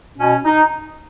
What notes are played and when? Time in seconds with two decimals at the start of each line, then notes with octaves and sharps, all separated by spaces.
0.19 B2 C#4
0.45 D#4